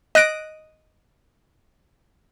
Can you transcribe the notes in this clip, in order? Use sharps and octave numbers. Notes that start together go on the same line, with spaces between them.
D#5 F#6 A#6 D7